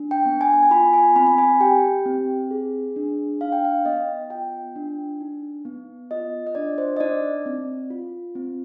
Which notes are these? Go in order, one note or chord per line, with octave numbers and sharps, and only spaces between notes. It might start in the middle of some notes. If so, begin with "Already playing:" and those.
Already playing: D4
G5
B3
G#5
G#5
F4 B5
G#5
C4 B5
B5
G#5
G4 G5
C4
G#4
D4
D#4 F5
G5
F5
B3 D#5
F4 G5
D4
D#4
B3
F4 D#5
D#5
D4 D5
C5
D#5
D#4 D5
C4
F4
C4